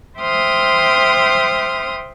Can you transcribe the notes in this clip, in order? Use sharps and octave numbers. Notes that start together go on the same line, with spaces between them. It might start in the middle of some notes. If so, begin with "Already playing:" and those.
C5 E5 G5 C6 D#6 F6